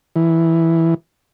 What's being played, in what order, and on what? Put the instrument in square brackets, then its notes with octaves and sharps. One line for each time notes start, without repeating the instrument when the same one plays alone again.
[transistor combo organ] E3